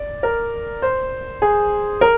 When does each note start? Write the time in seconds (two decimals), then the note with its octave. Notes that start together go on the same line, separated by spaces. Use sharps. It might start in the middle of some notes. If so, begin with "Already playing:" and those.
Already playing: D5
0.23 A#4
0.82 C5
1.42 G#4
2.01 A#4